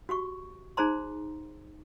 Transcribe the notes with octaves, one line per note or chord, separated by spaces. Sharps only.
F#4 G4 C#6
D#4 G#4 C5 A#5 C6